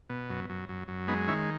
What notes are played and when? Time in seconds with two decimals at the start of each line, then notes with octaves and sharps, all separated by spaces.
0.09 B2
0.30 F#2
0.50 F#2
0.69 F#2
0.88 F#2
1.08 G#3 B3 D#4
1.28 D#3 C#4 E4